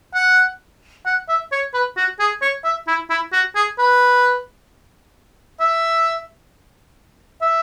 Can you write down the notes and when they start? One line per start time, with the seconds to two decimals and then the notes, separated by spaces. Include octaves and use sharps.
0.15 F#5
1.06 F#5
1.29 E5
1.52 C#5
1.74 B4
1.97 F#4
2.20 G#4
2.42 C#5
2.64 E5
2.88 E4
3.10 E4
3.32 F#4
3.55 G#4
3.78 B4
5.60 E5
7.42 E5